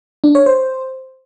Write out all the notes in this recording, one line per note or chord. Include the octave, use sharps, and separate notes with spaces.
D4
C#5
C5